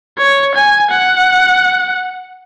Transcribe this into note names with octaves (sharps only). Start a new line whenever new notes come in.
C#5
G#5
F#5